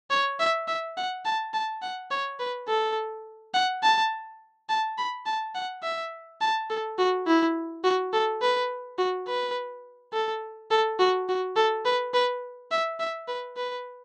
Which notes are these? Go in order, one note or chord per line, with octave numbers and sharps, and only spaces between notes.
C#5
E5
E5
F#5
A5
A5
F#5
C#5
B4
A4
F#5
A5
A5
B5
A5
F#5
E5
A5
A4
F#4
E4
F#4
A4
B4
F#4
B4
A4
A4
F#4
F#4
A4
B4
B4
E5
E5
B4
B4